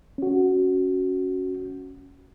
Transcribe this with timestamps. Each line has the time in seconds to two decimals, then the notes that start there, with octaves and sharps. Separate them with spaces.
0.18 C#4 F#4